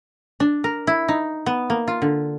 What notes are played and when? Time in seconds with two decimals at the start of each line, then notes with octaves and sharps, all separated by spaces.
0.40 D4
0.64 A#4
0.87 E4
1.08 D#4
1.46 B3
1.70 A#3
1.88 F4
2.02 D3